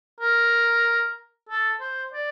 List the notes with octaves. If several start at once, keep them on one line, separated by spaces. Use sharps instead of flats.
A#4
A4
C5
D5